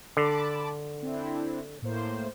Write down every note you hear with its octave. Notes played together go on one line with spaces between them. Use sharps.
D3 A5 B5 D6
C4 D4 E4
A2 A#3 C5